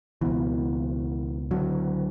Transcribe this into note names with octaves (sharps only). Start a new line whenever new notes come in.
C#2 B2 E3
D3 F#3